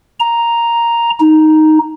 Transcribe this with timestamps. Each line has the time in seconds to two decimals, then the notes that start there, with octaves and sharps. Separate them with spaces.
0.20 A#5
1.20 D#4